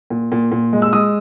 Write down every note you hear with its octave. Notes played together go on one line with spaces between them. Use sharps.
A#2
A#2
A#2
G#3
E6
G#3 D#6